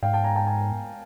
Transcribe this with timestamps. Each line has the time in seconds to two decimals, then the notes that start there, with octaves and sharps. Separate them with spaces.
0.03 G#2 F5 G5
0.13 G5 A5
0.24 G#5 A#5
0.36 G5 A5
0.47 G#5 A#5